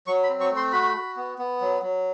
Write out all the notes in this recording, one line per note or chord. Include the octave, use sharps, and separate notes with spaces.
F#3 C#6
B5
C4
C#6
A3
C6
F#4 B5
F#4
B3
B3
F#3
F#3